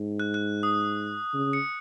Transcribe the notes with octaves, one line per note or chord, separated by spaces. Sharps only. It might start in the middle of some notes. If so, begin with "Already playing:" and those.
Already playing: G#2
F#6
F#6
D#6
C#3
C#7